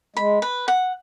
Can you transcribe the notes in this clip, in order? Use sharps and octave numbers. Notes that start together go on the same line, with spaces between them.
G#3 B5
B4
F#5